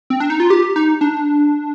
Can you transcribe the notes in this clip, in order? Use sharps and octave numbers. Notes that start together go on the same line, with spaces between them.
C4
D4
D#4
F4
G4
D#4
D4